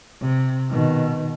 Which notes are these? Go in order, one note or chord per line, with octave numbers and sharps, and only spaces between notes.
C3
B2 D#3